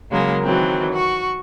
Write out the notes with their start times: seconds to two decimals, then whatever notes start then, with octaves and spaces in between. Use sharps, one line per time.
0.10 C#3 F#3 G#3 A#3 A#4
0.44 D#3 E3 F#3 C4
0.94 F#4 C#6